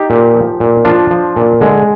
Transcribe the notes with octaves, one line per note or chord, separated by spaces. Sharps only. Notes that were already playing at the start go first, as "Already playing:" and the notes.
Already playing: D#4 G4
A#2
F3
A#2
F3 D4 F4
F3
A#2
D3 G#3